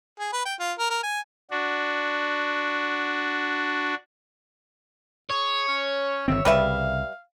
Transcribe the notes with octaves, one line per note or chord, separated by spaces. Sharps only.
G#4
B4
G5
F4
A#4
A#4
G#5
D4 F#4
G#4 C#5
C#4
G1 D#3 C4 E5
C2 C#3 G3 B4 E5 F5